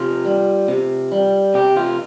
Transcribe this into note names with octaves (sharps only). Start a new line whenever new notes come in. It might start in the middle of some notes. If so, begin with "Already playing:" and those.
Already playing: C3 F4
G3
C3
G3
C3 G4
F4